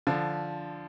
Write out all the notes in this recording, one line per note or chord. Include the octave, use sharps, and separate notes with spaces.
D3 F3